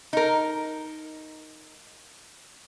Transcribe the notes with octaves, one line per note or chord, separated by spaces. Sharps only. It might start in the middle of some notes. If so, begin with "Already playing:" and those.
D#4 A#4